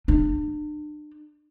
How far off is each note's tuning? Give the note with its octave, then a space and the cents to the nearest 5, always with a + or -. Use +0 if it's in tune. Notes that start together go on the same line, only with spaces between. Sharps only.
D4 +40